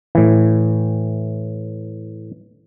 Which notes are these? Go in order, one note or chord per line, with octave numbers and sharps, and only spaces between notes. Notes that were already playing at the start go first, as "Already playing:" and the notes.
A2 E3